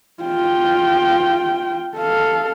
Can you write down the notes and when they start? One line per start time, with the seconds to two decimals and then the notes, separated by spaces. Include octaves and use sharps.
0.23 F4 G5
1.97 A4 F5